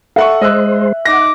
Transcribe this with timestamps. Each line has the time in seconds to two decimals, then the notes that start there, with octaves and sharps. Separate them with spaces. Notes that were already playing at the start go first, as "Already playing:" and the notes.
0.16 A4 E5 F#5 C#6
0.41 G#3 C5 D#5 E6 F#6
1.05 D#4 F#5 D6 A#6